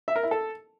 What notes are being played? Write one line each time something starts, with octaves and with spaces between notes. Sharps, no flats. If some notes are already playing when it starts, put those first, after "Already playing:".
E5
A#4
E4
A4